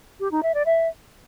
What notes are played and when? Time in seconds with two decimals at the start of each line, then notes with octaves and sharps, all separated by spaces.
0.20 G4
0.31 D#4
0.43 E5
0.54 D5
0.66 E5